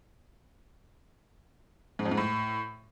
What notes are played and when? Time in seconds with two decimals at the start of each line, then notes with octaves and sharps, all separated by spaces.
1.99 G#2
2.05 F2
2.11 G#2
2.17 A2